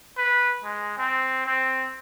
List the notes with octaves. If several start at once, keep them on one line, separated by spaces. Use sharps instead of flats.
B4
G#3
C4
C4